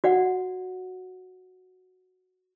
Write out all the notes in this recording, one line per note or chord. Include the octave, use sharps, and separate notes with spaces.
F#4 D5 F#5